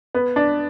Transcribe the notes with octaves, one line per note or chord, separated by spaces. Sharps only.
B3
D4